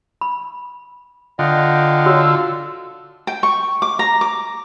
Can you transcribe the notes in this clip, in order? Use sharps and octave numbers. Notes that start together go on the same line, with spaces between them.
B5
D3 F4 D#5 F#5 G5
F#4 C#5 E6
G5
C#6
D6
A#5
D6